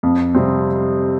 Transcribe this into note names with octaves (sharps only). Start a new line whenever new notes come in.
F2
C3 G3 C4